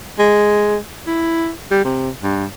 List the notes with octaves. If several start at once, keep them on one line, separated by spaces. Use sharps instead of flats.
G#3
E4
G3
C3
G2